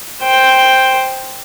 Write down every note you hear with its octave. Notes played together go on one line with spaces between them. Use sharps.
C5 G5